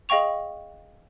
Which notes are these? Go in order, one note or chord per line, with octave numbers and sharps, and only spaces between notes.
G#4 D#5 F5 G5 C#6 F7